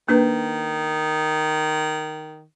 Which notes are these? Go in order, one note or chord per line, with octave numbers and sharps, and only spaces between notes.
D#3 A#3 D4 B4